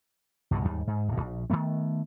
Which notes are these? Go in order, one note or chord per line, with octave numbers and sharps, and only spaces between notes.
C2 G2 B2 D3
D#2 G#2 G3
G#2
D1 B2
A#1
D#3 F#3 A3 B3